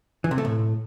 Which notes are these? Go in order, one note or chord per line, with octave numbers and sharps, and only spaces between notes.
E3
C3
A3
A2